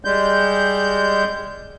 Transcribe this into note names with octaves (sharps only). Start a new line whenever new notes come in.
G3 G#3 G6